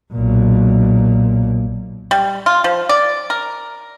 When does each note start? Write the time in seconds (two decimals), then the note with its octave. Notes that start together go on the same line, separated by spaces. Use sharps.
0.13 B1 A#2
2.11 G3
2.46 F4
2.64 F3
2.89 D5
3.30 A#4